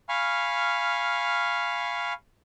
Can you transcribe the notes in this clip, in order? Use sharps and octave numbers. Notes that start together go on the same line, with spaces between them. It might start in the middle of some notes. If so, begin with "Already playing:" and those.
F5 G#5 B5 C#6 F6